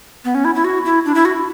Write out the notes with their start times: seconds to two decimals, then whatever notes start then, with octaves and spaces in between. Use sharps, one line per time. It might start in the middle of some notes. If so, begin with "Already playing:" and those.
0.25 B3
0.35 C#4
0.45 E4
0.55 E4
0.64 F#4
0.85 E4
1.05 D4
1.15 E4
1.25 F#4